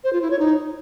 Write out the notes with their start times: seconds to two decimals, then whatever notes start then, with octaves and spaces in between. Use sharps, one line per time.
0.04 C5
0.13 F4
0.22 E4
0.30 C#5
0.39 D#4